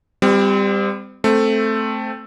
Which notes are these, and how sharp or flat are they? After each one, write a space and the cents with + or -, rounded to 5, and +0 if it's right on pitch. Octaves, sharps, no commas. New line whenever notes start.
G3 +20 C4 -30 F4 +5
A3 +0 C4 +5